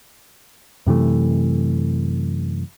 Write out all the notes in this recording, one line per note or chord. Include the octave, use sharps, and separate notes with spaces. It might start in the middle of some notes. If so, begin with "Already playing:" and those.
F#2 C3 E3 A3